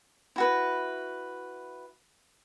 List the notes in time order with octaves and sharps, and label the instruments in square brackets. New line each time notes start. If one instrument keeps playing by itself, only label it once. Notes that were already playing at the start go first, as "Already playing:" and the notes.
[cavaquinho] E4 F#4 B4